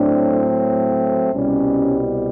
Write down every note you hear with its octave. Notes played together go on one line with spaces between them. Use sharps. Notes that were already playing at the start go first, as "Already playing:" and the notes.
Already playing: A2 F#3 A3 C4 D4
C2 B2 G3 C#4